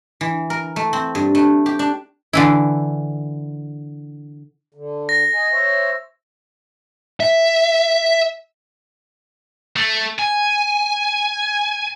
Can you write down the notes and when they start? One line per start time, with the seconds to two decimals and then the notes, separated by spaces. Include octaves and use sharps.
0.21 E3
0.50 A#4
0.76 A3
0.93 C4
1.15 G2
1.35 A3
1.66 G4
1.79 D4
2.33 D3 E3 E4
4.75 D3
5.09 A#6
5.34 D#5 G#5
5.52 C5 C#5 E5
7.20 E5
9.76 A3
10.19 G#5